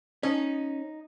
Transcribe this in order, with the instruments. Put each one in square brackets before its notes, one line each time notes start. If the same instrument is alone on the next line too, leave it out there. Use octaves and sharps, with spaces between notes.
[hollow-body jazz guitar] C#4 [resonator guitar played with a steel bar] D#4